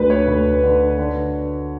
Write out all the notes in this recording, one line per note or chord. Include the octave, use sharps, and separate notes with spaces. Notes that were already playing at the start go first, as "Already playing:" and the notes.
Already playing: D2 D3 B4
C#5
D2
D3
D3